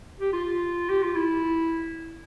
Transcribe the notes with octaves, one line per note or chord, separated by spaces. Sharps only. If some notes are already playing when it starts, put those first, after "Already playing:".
G4
F4
G4
F4
E4